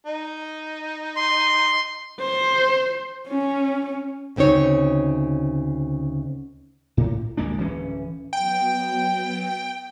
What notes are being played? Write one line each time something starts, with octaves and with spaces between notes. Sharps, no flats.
D#4
C6
C5
C#4
D2 C#3 C4 D#4 C#5
A2
D2 G#3 A#3 D4
D1 E3 C#4
F#3 B3 G5